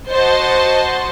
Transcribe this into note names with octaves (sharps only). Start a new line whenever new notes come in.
F#4 C5 D#5 F#5 A5 C6